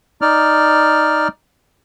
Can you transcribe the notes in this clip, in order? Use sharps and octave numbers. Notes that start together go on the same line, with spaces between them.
D#4 D5 F6